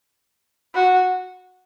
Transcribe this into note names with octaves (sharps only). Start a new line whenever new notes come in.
F#4